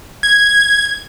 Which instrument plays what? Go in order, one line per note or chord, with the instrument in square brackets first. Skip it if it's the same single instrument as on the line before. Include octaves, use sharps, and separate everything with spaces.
[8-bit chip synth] G#6